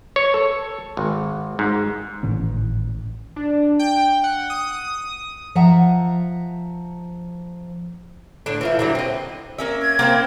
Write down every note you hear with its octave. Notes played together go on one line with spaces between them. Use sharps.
C#5
A4
G#1
G#2
G#1 A2 E3 C#4
D4
G5
F#5
D#6
F3 E5 F#5 A#5
A2 D3 D4
E3 F3 E4
D3 F#3 G3
C4 D#5
A#3 C#4 E5
G#6
A#3 C4 E4